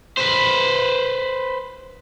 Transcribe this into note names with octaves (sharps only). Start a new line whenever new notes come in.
B4 C5